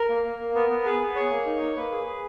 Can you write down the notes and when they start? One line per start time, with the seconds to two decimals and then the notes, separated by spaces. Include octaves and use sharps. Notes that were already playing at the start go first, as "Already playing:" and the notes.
Already playing: A#4
0.09 A#3
0.25 A#3
0.39 A#3
0.55 B3 A#4
0.70 B3
0.85 G#4 B4
1.00 B3
1.15 G#4 C#5
1.31 A#3
1.46 D#4
1.61 A#3
1.76 A#3 B4
1.92 G#4
2.07 G#4